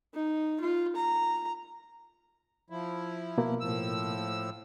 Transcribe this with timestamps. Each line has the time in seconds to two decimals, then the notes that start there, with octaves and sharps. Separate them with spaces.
0.14 D#4
0.61 F4
0.96 A#5
2.70 F3 E4
3.38 B2 A#3
3.61 A2 F3 E6